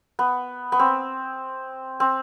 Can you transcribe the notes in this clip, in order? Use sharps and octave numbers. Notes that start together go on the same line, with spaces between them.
B3
B3
C4
C4